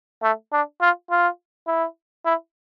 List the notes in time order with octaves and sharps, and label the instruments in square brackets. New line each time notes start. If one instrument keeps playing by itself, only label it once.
[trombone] A3
D4
F4
F4
E4
E4